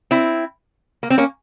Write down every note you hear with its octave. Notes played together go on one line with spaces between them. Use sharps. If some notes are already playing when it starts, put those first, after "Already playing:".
C4 E4
A#3
C4
A#3 C#4